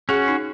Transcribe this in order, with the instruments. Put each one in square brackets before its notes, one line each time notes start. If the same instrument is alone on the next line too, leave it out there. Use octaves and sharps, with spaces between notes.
[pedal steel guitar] C#4 F#4 [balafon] G#4
[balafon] D#4